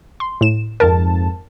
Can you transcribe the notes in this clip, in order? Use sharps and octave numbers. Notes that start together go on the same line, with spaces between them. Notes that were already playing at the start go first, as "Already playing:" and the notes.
C6
A2 E7
F2 G#2 A#4 A5